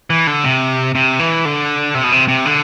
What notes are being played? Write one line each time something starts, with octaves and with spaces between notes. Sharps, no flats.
E3
D3
C3
C3
E3
D3
C3
B2
C3
C3
D3